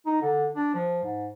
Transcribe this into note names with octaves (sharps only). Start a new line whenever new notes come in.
D#4
D3
D4
F3
G#2